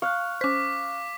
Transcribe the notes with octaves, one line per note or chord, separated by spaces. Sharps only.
F5 C#6 F6 F#6
C#4 C5 D6 B6